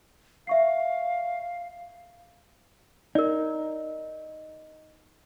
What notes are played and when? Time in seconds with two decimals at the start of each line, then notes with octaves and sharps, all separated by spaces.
0.47 E5 F5 C#6 C7
3.15 D#4 A#4 D5